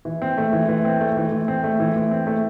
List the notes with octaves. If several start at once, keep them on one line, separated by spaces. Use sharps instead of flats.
E3
C4
A3
E3
E3
C4
A3
E3
E3
C4
A3
E3
E3
C4
A3